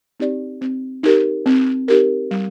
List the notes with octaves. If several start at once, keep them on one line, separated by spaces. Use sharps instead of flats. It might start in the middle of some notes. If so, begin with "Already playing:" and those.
C4 D#4 G4 D5
C4
D#4 G4 A#4
C4
D#4 G4 A#4
G3